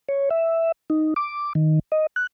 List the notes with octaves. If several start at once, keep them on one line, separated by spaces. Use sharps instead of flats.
C#5
E5
D#4
D6
D#3
D#5
F#6